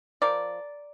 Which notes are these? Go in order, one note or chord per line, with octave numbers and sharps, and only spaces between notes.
F3 A#4 D5